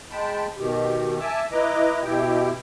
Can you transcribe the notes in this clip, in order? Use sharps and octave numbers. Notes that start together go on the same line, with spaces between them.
G#3 G5 A5 B5
B2 D#3 G4
E5 G#5 A5 D6 E6
E4 B4 D#5 A#5 D6
B2 E4 G4 G5